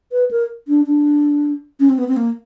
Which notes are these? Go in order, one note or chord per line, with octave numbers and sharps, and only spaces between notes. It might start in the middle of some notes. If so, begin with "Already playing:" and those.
B4
A#4
D4
D4
C#4
C4
B3
C4
A#3